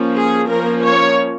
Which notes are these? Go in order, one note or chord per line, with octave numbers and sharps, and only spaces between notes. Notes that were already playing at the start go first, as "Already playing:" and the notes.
Already playing: F3 A#3 C#4
G#4
F3 A#3 C#4 A#4
C#5